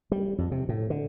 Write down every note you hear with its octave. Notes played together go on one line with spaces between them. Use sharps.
G3
F2
C3
A2
D3